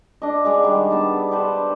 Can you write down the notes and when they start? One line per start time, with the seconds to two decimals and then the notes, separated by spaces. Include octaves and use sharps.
0.22 D4 D#5
0.45 G#3 G#4 D5 F#5
0.63 D#3 G3
0.90 B3 D4 A5
1.31 G4 A4 B4 C5